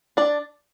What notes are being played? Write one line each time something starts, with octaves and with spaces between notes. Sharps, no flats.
D4 D5